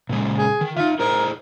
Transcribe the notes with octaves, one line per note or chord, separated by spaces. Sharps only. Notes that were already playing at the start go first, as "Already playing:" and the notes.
A#2 C#3 G#3
G#4
D#3
D#4 F4 E5
E4 G#4 A#4 C5